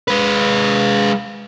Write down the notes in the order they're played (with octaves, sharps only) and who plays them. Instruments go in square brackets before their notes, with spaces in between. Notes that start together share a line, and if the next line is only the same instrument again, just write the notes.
[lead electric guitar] G#3 B4